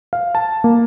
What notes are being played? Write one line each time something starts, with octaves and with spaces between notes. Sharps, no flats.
F5
A5
A#3